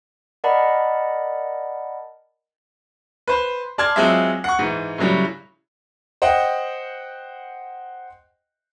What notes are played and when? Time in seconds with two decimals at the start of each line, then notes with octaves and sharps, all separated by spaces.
0.44 A#4 D5 D#5 F#5 A5 B5
3.28 B4 C5
3.78 D5 A5 C6 D6 F6 G#6
3.96 F#3 G#3 C4 F4 G#4 E5
4.44 F#5 C#6
4.59 G#2 E3
4.98 A2 C#3 F#3 G3
6.22 C5 D#5 F#5 G5